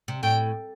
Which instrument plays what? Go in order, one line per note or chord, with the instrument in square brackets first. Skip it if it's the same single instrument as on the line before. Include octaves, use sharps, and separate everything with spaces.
[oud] C3
[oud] A2 [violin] G5